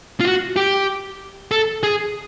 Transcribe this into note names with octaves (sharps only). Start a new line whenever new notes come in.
F4
F#4
G4
A4
G#4